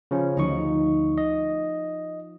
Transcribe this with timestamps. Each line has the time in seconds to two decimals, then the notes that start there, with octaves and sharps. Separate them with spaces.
0.11 C#3 F3 C#4
0.37 D2 F3 D#4 C#6
1.18 D#5